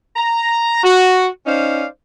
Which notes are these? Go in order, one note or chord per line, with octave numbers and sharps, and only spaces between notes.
A#5
F#4
C#4 D#4 C5 D5 F5